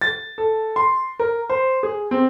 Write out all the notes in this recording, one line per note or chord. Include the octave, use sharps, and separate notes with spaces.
A6
A4
C6
A#4
C5
G#4
C4